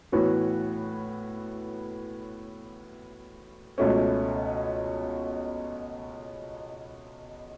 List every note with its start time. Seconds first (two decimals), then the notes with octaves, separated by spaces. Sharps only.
0.12 A2 E3 B3 F#4 C#5
3.78 C#2 B2 A3 C#4